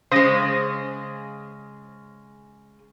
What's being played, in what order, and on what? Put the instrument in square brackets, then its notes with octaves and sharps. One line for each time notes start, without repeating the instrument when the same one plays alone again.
[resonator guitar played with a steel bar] C#3 G#3 [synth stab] C5 D#6 A#6